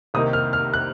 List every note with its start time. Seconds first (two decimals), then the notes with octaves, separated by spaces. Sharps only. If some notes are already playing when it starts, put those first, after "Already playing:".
0.14 C2 C3 D#3 A#3 D#4 D#6
0.33 F6
0.53 F6
0.73 F#6